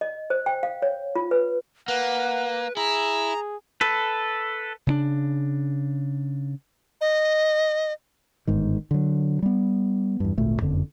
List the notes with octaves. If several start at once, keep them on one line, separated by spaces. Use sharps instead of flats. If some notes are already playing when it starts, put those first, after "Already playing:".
D#5
C5
G5
F5
C#5
F4
B4
A#3 B4 F#5
E4 G#4 A#5
A4 B4
C#3 C4 D4
D#5
G1 G#2 D#3
D3 F#3
G3 B3
E2 G2
G#1 D2 A#2 A3
F#1 F2 D3